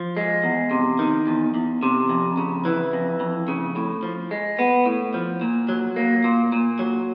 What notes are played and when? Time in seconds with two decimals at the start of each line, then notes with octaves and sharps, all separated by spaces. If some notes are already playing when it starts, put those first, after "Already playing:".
Already playing: F3
0.17 G#3
0.44 E2
0.71 C3
0.99 D#3
1.27 E2
1.54 E2
1.83 C3
2.09 F2
2.37 C#3
2.65 E3
2.93 F2
3.20 F2
3.48 C#3
3.76 A2
4.03 F3
4.31 G#3
4.59 B3
4.86 A2
5.14 F3
5.41 A#2
5.69 F#3
5.96 A#3
6.24 A#2
6.52 A#2
6.79 F#3